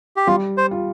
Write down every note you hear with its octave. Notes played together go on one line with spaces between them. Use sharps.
G4
G3 F4
C5
F4